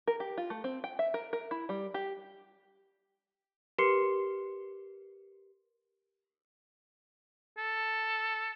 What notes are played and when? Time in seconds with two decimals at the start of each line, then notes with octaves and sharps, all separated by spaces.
0.07 A#4
0.20 G4
0.38 F4
0.50 A3
0.64 C4
0.84 G5
0.99 E5
1.14 A#4
1.33 A#4
1.51 E4
1.69 G3
1.94 G4
3.78 G4 A#4 B4 C6 C7 C#7
7.58 A4